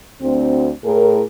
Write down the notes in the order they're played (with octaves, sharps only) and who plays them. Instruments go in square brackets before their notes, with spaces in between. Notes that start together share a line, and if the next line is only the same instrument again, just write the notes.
[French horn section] D2 C4
A2 G#4 A#4